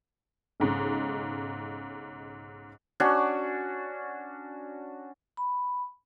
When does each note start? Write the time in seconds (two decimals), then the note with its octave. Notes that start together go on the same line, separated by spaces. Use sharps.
0.60 B1 G#2 C#3
3.00 C#4 D4 F#4
5.37 B5